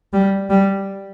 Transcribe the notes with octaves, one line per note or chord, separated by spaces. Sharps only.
G3
G3